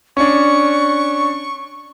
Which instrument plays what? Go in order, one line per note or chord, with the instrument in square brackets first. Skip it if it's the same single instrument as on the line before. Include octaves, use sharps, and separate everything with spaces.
[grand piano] C#4 D4 [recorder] C#6